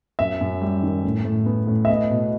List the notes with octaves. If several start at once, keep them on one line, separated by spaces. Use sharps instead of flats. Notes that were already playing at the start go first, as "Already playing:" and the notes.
F#2 E5
F#2
G3
D#3
A2
A2
B3
A2
E5
B3 D#5
B2